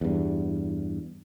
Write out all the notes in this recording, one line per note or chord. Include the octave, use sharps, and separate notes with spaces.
E2 G2